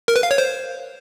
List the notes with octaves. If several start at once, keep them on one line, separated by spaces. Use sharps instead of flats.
A#4
B4
F5
C#5
C5